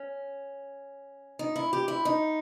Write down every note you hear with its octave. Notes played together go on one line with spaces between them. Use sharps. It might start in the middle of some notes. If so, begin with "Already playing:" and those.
Already playing: C#4
D#4
E4
G4
E4
D#4